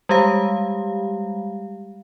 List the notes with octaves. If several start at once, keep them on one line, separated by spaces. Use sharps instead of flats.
G3 G#3 G4 F5